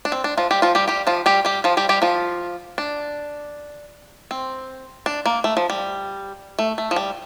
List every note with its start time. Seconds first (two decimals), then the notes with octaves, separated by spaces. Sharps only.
0.05 D4
0.12 C4
0.24 D4
0.37 F3 F4
0.51 G3 G4
0.62 F3 F4
0.75 G3 G4
0.88 G3 G4
1.07 F3 F4
1.26 G3 G4
1.45 G3 G4
1.64 F3 F4
1.77 G3 G4
1.89 G3 G4
2.02 F3 F4
2.78 D4
4.31 C4
5.06 D4
5.26 A#3
5.44 A3
5.57 F3
5.70 G3
6.59 A3
6.78 A3
6.91 F3
6.96 G3